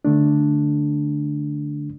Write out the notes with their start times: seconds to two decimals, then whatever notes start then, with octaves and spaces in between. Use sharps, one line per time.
0.05 D3 A3 D4